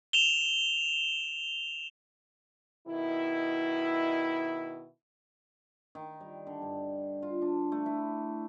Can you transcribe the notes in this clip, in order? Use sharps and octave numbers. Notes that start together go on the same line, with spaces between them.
E7 F7 G7
B2 D#3 E4
D#3
G3
D3
G2
F4
D4
A3
E4